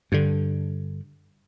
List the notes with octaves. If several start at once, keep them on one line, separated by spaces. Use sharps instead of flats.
G2 D3